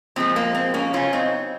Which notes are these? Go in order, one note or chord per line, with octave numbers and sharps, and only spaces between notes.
A#2 F3 G#3 C4
A#3
C4
A#3 C#4
C#3 F#3 C#4 F4
C4 D#4